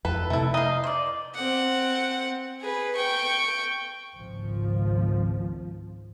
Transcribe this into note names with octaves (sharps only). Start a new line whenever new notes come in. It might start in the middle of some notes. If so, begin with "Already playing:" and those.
F2 A4 B4
C3 A3 E4
D#4 D#5 F5
C5 D5
C4 F#5
G#4 B4
G5 C#6
G#1 C#2 G#2 F3